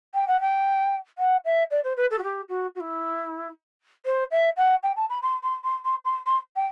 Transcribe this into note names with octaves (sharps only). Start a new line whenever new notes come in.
G5
F#5
G5
F#5
E5
D5
C5
B4
A4
F#4
G4
F#4
F#4
E4
C5
E5
F#5
G5
A5
B5
C6
C6
C6
C6
C6
C6
G5